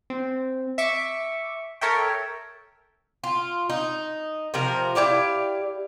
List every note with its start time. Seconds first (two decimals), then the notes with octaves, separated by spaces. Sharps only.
0.10 C4
0.78 E5 C#6 D6
1.81 A4 A#4 C#5 E5 G5
3.24 F4
3.70 D#4
4.54 C3 F3 A#4
4.95 E4 G4 D5 F5